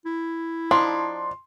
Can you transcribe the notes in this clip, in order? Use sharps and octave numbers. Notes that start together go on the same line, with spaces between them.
E4
F3 D4 D#4 C6